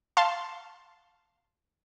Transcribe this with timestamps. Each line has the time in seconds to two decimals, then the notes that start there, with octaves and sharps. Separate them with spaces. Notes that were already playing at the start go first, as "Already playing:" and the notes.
0.17 F5 A5 C6